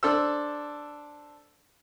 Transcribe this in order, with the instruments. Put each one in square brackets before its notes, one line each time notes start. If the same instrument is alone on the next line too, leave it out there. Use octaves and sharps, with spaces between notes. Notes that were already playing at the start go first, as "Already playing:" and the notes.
[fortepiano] D4 A4 C5 E6